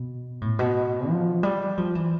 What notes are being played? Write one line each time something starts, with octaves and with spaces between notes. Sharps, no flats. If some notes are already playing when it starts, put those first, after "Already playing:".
Already playing: B2
A2
B2
F3
G3
F3
E3